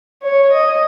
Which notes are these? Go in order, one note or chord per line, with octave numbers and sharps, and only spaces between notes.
C#5
D#5